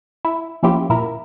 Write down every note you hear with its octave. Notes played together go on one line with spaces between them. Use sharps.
E4
F3 A#3 C#4 E4 F4 G4
A#2 E4 A#4